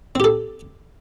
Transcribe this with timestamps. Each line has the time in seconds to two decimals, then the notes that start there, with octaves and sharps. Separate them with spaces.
0.15 C4
0.20 G4
0.24 A4